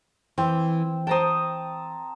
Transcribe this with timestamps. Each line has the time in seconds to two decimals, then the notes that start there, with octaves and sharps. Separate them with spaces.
0.38 E3 C4
1.07 C5 G5 A5 A#5 D#6